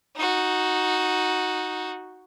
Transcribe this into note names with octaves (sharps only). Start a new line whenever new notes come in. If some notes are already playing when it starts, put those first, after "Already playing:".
D#4 F#4